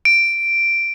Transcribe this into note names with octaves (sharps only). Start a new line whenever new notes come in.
D7